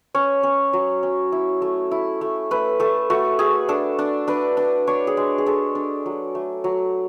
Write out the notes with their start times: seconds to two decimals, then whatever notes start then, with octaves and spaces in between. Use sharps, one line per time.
0.14 C#4 C#5
0.43 C#4
0.73 F#3
1.03 C#4
1.32 E4
1.62 A3
1.91 E4
2.21 A3
2.51 A3 B4
2.80 A3 A4
3.10 A3 F#4
3.39 A3 G#4
3.69 D4 A4
3.99 D4
4.27 D4 B4
4.57 D4
4.87 D4 C#5
5.07 G#4
5.17 G#3
5.38 G#4
5.46 G#3 A4
5.75 D4
6.06 F#3
6.35 A3
6.64 F#3